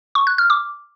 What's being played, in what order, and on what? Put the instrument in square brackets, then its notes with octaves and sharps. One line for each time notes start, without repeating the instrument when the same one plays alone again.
[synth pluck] C#6
F#6
F6
D6